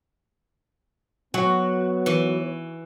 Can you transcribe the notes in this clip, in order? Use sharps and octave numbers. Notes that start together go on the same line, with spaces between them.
F#3 B3 F#4
E3